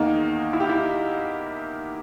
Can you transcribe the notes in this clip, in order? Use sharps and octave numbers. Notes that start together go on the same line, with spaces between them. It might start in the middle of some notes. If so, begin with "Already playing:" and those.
Already playing: E2 D#3 A#3 D#4
E4
G4
E4